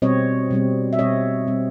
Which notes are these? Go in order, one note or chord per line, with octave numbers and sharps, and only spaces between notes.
B2 G3 C4 C#5 D#5
B2 G3 C4
E5
B2 G3 C4 C#5 D#5
B2 G3 C4